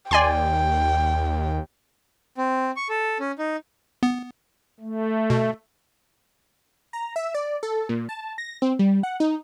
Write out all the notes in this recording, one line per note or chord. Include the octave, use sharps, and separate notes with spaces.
D#2 D5 G5 G#5 C6
C4
C#6
A4
C#4
D#4
B3
A3
B2
A#5
E5
D5
A4
A#2
A5
A#6
C4
G3
F#5
D#4